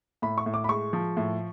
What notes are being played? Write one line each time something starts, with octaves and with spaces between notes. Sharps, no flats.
A2 B5
C#6
A2
D6
B5
G#3 C#6
F3
A2